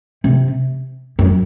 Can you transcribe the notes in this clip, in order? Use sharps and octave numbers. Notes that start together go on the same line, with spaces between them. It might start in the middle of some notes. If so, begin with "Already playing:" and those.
C3
F#2